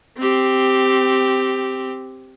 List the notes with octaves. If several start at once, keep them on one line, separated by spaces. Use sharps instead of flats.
C4 G4